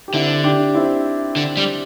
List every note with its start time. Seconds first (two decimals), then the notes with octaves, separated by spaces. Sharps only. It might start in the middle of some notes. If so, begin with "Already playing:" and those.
0.08 G4
0.14 D3 C4 E4
0.44 D4 G4
0.75 C4 E4
1.36 D3
1.57 G3